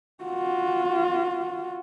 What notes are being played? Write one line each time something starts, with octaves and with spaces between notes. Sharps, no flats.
F4 F#4